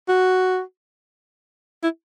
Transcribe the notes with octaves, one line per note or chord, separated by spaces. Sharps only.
F#4
E4